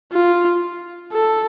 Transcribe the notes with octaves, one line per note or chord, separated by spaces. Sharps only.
F4
A4